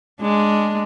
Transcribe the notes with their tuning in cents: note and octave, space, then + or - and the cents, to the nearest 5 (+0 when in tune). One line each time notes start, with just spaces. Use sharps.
G#3 +0 D4 +0